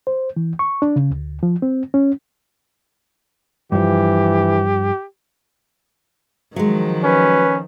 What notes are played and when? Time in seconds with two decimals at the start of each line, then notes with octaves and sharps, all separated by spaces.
0.07 C5
0.37 E3
0.59 C#6
0.82 D4
0.96 C#3
1.11 D2
1.43 F3
1.62 C4
1.94 C#4
3.72 G2 E3 F3 G4
6.56 D#3 F3 F#3 G#3
7.03 C#4 B4